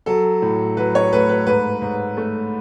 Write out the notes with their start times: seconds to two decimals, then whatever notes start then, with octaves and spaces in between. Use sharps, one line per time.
0.06 F#3 A4
0.42 A2
0.77 F#3 B4
0.95 C#5
1.13 A3 B4
1.29 B4
1.47 G#2 B4
1.82 G#2
2.17 A3